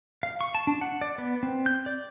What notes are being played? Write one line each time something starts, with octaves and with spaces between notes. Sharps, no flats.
F5
C#6
A5
D4
F#5
D5
B3
C4
G6
D5